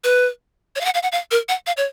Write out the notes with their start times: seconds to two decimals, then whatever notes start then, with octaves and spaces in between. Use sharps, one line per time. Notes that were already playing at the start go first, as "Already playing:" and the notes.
0.04 B4
0.76 C#5
0.81 F5
0.85 F#5
0.94 F5
1.03 F#5
1.12 F5
1.31 A#4
1.49 F#5
1.67 F5
1.77 C#5